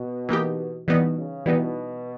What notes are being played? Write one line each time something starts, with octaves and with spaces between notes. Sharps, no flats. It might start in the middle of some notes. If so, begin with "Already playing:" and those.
Already playing: B2
E3 A#3 D#4 G4
B2 E3 G3 B3 D#4
C#3
B2 E3 G3 B3 D#4